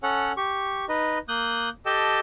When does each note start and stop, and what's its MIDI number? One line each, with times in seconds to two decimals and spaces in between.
0.03 0.32 61
0.03 0.32 69
0.03 0.32 73
0.03 0.32 78
0.37 0.85 67
0.37 0.85 85
0.89 1.18 63
0.89 1.18 71
0.89 1.18 75
1.28 1.69 58
1.28 1.69 87
1.28 1.69 90
1.28 1.69 91
1.86 2.20 67
1.86 2.20 69
1.86 2.20 75
1.86 2.20 79
1.86 2.20 81